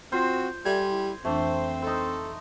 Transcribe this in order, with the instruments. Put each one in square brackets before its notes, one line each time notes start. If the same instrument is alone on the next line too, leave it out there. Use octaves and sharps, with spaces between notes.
[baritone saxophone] C4 [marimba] F4 [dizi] F#4 [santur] C5
[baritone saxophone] G3 [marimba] A4 E5 [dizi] D5 [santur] G#5
[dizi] E4
[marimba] F2 E3 D4 [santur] A3 [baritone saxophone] C4 [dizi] C5
[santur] D#4 C6 [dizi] A4 [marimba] E6